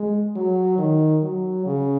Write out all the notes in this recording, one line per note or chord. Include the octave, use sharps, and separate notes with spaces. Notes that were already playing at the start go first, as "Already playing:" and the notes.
Already playing: G#3
F#3
D#3
F#3
C#3